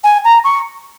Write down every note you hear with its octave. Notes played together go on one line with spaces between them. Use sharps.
G#5
A#5
C#6